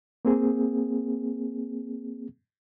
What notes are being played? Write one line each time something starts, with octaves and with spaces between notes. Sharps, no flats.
A#3 C4 G#4